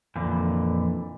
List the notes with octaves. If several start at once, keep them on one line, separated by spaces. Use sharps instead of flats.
F2 A#2 D3 E3